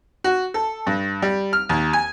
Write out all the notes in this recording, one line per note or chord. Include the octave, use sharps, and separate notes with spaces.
F#4
A4
G2
G3
F6
D#2
G#5